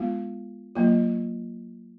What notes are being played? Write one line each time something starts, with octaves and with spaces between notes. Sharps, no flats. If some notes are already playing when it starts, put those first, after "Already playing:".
Already playing: G#3 B3 F4
F#3 A#3 F4